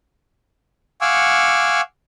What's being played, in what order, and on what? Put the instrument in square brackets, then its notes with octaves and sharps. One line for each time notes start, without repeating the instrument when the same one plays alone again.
[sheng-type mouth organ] F5 F#5 G#5 C#6 D6 E6